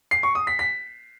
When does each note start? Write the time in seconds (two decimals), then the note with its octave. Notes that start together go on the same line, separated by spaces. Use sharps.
0.11 C7
0.23 C#6
0.35 D#6
0.47 B6
0.59 B6